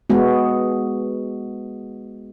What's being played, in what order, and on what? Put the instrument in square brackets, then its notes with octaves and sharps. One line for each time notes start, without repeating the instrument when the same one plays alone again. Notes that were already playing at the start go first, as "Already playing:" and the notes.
[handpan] G#3 B3 F#4